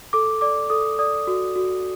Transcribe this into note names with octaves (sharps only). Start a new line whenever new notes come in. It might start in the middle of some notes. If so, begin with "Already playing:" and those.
A4 D6
D5 D6
A4 D#6
D5 D#6
F#4
F#4